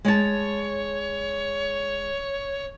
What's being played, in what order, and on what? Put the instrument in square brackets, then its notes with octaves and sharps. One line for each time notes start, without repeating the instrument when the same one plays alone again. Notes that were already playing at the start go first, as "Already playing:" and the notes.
[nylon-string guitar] G#3 A5 [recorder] C#5